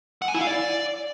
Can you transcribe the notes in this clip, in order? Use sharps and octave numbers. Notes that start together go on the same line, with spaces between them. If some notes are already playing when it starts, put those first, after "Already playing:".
F#5
G#5
E4
F5
D5